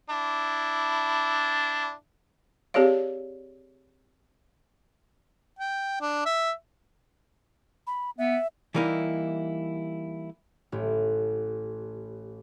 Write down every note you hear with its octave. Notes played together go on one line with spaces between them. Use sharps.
D4 E4
C4 G4 G#4 C#5 D5 F5
G5
D4
E5
B5
B3 E5
E3 G3 A#3 D#4 E4
A1 A2 G4